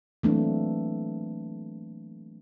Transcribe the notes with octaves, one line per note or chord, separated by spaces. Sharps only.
E3 F#3 A3 A#3 C4 D4